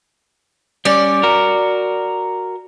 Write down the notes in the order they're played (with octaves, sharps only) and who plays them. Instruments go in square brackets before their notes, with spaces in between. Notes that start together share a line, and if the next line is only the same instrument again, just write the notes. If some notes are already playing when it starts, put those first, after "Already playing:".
[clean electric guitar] G3 C#4 [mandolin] D5
[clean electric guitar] F#4 A#4